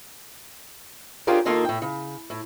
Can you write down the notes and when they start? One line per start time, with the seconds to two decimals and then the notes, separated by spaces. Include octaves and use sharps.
1.27 C#4 D4 F4 G4 G#4 A#4
1.45 D#2 D#3 A#3 F4 A4
1.65 A2 G5
1.82 C#3
2.30 A2